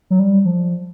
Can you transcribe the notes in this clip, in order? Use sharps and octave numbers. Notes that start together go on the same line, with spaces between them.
F#3
G3
F3